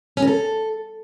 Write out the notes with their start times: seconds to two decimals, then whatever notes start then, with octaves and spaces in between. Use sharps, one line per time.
0.17 C#4
0.22 A#4
0.27 A4